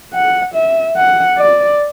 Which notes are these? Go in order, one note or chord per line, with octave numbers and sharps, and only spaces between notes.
F#5
E5
F#5
D5